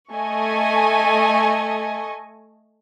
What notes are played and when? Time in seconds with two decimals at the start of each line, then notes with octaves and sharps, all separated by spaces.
0.13 A3 D#5 G#5 C#6